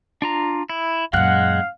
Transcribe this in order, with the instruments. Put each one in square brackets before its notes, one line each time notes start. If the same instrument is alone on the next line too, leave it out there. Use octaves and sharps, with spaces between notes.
[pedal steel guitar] D4 F4 A#5
E4
[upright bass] F#2 A#2 [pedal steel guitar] G#3 F#6 [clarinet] F5 [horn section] F#5